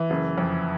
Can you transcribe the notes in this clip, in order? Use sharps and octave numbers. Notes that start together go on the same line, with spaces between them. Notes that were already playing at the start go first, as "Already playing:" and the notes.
Already playing: E3
F#1
F2